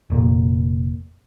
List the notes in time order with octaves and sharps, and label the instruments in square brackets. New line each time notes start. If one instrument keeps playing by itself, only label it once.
[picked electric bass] F1 A#2